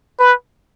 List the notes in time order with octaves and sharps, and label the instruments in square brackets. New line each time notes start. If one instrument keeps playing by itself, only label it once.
[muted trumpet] B4